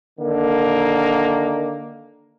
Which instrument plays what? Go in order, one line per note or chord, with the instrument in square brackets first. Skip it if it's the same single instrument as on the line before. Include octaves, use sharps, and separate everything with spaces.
[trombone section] D3 D#3 A#3